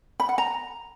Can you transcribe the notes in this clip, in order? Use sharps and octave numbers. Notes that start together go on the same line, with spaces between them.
B5
F#5
A#5